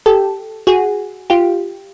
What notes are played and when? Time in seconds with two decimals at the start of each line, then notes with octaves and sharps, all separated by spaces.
0.06 G4 A4
0.67 F#4 G#4
1.30 F4 G4